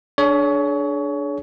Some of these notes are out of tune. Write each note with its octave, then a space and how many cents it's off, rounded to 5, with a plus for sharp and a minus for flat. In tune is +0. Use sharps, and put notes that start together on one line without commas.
D4 +0 G#4 +35 C#5 +25